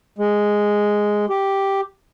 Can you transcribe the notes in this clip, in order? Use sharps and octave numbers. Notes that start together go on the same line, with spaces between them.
G#3
G4